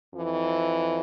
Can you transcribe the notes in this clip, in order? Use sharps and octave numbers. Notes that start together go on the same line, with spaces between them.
F2 E3